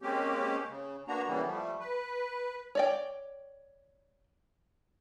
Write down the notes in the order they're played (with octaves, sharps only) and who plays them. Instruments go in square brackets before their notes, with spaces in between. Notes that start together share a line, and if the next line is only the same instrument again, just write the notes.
[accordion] G#3 A#3 C4 C#4 G4
C#3
A#3 B3 D4 F#4 A#5
C#3 E3 G3 A#3 B3
F3 G3 A3
B4
[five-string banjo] C#5 D5 G5